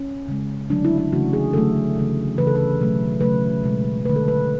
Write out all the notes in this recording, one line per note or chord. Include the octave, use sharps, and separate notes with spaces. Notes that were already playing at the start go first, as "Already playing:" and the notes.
Already playing: C#4
C#3 G#3
D3 F#3 A3 D4
E4
E4
C#3 E3 A3 F#4
G#4
D3 F#3 A3 A4
C#3 E3 A3
C#3 E3 A3 B4
A4
B4
B2 F#3 A3
C#3 F#3 A3 B4
B2 G#3
D3 A3 B4
A4
B4